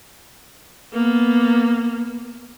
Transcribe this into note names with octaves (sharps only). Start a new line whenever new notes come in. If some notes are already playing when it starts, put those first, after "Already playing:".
A#3 B3